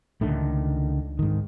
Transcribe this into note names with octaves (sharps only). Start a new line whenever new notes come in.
C#2 D3 D#3 A3
G#2 D#3